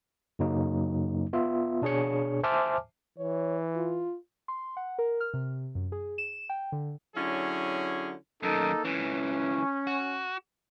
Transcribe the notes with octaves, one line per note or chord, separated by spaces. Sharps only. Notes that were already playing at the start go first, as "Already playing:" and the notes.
F#2 C#3 F#3 A#3 D#4
B3 F4 E5
B2 D4 G#4 C#5 C#7
C5 E5 G#5 A5 D6 F6
E3 C#5
F4
C6
F#5
A#4
F6
C3
F#2
G#4
E7
G5
D3
D3 F#3 C#4 E4 G#4
F#2 D#3 A#3 D#4 A4
C#2 E3 C#4
F#4